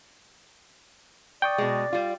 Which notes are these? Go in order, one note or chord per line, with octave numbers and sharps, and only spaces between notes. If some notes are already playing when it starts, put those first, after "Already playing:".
D5 G5 C#6 D#6
B2 G#3
G3 F4